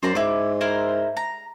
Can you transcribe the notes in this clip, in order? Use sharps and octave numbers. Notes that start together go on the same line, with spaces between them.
F#2 C5 D5 A#5
G#2 E4 D6
E4 A#4 C5
A#5